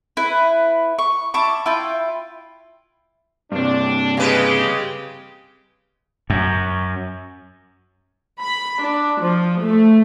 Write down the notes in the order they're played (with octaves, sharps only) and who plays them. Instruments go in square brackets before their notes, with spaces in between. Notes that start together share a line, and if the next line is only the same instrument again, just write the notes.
[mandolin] E4 B4
C#6
E4 A5 C#6 D6
E4 F4 G5
[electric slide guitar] G2 C3 [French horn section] D4
[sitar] C#3 B4 [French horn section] G#3 G4
[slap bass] F#2
[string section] B5
D4
F3
A3